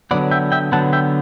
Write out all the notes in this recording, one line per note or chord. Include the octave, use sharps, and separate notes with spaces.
D3 F#3 B3 D5 F#5
E5 G5
E5 G5
D3 F#3 B3 F#5 A5
E5 G5